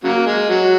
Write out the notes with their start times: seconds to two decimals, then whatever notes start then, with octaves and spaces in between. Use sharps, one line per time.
0.04 C#3 F#3 A#3
0.26 G#3
0.49 F#3